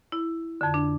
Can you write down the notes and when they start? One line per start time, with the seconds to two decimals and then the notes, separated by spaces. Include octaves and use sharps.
0.12 E4
0.61 F2 D3
0.74 D4